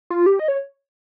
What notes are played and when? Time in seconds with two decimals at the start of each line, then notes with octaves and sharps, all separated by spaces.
0.10 F4
0.26 G4
0.39 D#5
0.48 C#5